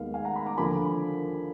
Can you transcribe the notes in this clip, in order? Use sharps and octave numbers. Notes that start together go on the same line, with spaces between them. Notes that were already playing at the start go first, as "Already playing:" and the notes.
Already playing: D#2 D#3 G#3 B3 F5
F5 G#5
F#5 A#5
G#5 B5
A#5 D6
D#2 D3 F3 A#3 G#5 B5